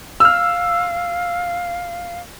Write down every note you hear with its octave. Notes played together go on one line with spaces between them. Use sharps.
F5 E6 F6